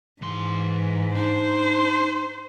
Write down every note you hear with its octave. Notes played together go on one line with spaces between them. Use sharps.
G#2 E3 C6
D4 D#4 C5